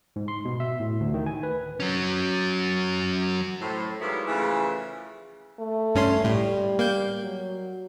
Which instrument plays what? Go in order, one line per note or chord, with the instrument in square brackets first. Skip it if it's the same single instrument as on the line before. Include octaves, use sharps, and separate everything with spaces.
[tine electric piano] G#2
C6
B2
E5
A2
D2
D#3
G#5
B4
[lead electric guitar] F#3 C#4
[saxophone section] A2 C5
G#2 F#3 G3 A#3 B3 E4
C#3 E3 F3 A3
[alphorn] A3
[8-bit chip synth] G2 C#4 C6
[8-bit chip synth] A2 [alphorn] G3
[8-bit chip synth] A#3 G6
[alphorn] F#3